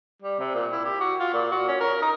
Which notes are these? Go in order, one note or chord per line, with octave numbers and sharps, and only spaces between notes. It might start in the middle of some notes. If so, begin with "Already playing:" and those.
G3
C3
A#2
E4
G4
F#4
F4
A#2
F#4
C#4
A#4
D#4